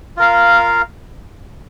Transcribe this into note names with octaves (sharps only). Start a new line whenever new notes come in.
F4 A#4 F5